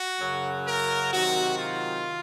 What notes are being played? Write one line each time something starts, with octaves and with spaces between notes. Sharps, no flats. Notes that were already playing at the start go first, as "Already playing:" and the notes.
Already playing: F#4
F#2 C#3 F#3
A#4
C3 D#3 F#3 F#4
F4